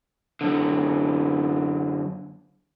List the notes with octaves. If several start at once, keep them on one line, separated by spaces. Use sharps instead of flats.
F#2 D3